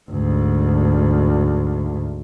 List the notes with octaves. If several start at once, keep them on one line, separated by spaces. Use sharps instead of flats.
D2 G#2